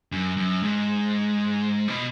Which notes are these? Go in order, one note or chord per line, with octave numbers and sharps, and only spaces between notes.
F#2
F#2
G#2
B2